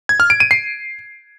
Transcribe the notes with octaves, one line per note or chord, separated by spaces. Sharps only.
G#6
F6
D7
D#7
C7